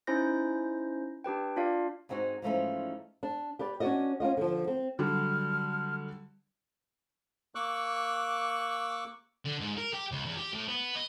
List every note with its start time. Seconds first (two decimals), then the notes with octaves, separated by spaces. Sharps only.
0.07 C#4 D#4 E4 C5 G6 A#6
1.24 D4 G4 B4 G5
1.56 D4 F4 D5 F5
2.09 G#2 G#3 C4 D#4 F#4
2.42 G#2 E3 F3 A3 C#4 D#4
3.23 D4
3.59 G4 B4 D5
3.80 C#4 D4 E4 F#4 D5 D#5
4.20 C#4 D4 F4 D#5
4.37 D3 F3
4.67 C4
4.99 D3 F#3 G3 F6
7.55 A#3 C#6 D6 E6 F#6
9.46 D3
9.61 G#2
9.78 A#4
9.94 G4
10.12 C#2
10.26 E2
10.37 G4
10.53 A2
10.68 B3
10.95 D#5